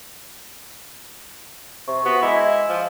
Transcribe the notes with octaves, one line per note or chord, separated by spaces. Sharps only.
C3 C#6
B3 F#4
G#3 E4 B5 D6 B6
G#6
F3